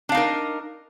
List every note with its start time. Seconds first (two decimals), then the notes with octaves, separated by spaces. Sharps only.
0.09 D4
0.12 F5
0.15 D#4
0.17 A#4